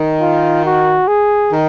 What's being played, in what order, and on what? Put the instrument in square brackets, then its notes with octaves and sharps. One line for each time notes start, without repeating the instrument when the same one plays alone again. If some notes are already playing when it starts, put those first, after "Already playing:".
Already playing: [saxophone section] D#3
[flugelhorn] F4
F#4
G#4
[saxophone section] D#3